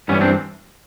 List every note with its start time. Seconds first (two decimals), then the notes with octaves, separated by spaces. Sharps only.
0.08 G2 E3 G3 B3 C#4
0.21 C4 D4